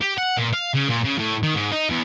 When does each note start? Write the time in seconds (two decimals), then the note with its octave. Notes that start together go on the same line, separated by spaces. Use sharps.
0.01 G4
0.18 F#5
0.37 A#2
0.53 F5
0.74 C#3
0.88 A#2
1.04 C#3
1.18 A2
1.43 D#3
1.55 G#2
1.72 D#4
1.90 E2